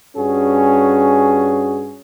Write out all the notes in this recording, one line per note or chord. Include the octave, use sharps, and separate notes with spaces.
G2 C#4 F#4 G#4